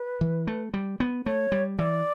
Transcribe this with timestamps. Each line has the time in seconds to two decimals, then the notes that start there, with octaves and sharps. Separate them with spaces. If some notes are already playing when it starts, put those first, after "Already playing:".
Already playing: B4
0.21 E3
0.47 A3
0.74 G3
1.00 B3
1.26 A3 C#5
1.52 G3
1.78 E3 D5